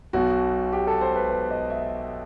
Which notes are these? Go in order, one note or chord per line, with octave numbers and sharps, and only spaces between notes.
B1 B2 F#4
G4
A4
C5
B4
B4
D#5
E5